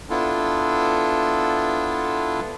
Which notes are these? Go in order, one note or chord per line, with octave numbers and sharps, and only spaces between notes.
B3 D4 E4 F4 A4